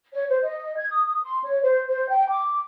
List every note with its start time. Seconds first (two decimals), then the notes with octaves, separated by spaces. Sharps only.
0.14 C#5
0.29 C5
0.43 D#5
0.77 G#6
0.89 D#6
1.23 C6
1.44 C#5
1.63 C5
1.88 C5
2.08 G5
2.30 D6